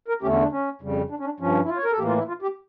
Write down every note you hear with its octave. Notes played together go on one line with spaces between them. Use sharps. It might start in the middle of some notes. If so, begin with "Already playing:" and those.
A#4
E2 D3 A3 C#4 G4
C#4
D4
C#4
F2 C#3 G3
D4
C#4
D4
G2 F3 C#4
E4
F4
C#5
A#4
A4
A2 E3 A#3 G4
F4
E4
F4
G4